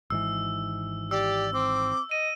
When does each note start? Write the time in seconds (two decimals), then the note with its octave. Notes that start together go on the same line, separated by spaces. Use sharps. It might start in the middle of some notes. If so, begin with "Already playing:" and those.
0.10 G#1 G#2 E3 E6
1.11 G4 D5 E6
1.53 C4 D6
2.11 D#5 D#7